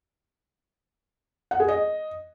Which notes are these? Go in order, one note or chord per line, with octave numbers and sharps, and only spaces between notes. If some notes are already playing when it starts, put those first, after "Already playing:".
F#5
G#4
D#5